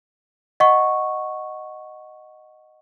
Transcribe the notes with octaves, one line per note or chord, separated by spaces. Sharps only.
D#5 F#5 C#6